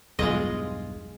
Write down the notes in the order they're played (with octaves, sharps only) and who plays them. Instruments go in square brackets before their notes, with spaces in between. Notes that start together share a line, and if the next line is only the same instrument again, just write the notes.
[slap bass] B1 E2 G2 [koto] G#3 D#5 [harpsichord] F4 G#4